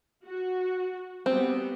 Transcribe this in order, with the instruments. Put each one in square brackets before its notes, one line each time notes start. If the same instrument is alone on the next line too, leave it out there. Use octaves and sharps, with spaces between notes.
[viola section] F#4
[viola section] G3 B3 [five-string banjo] C4